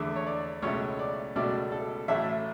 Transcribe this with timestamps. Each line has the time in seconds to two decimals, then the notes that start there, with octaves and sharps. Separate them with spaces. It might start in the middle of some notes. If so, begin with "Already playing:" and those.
Already playing: E2 D3 A3 E5
0.16 C#5
0.27 D5
0.62 C#2 B2 F#3 A3 C#5
0.99 D5
1.36 C#2 B2 F#3 A3 D5
1.72 A4
2.08 A1 A2 F#3 A3 E5